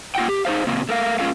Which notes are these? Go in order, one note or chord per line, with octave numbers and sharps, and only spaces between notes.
A#3 F4 F#5 G5
G4
D#4 G#4 C5 F5
A#2 C#3 A#3 C4
A3 A#4 F5
G#3 A#3 C#4 F4 A4 F5